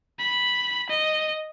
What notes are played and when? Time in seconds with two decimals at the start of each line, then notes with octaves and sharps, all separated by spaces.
0.19 B5
0.89 D#5